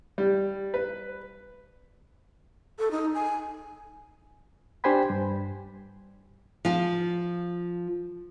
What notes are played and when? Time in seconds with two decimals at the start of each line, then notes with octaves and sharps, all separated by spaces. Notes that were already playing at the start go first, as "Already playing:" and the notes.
0.18 G3
0.74 B4
2.79 A4
2.91 D#4
3.14 G#5
4.84 D4 G4 C5 G5 G#5 B5
5.10 G2
6.65 F3 F4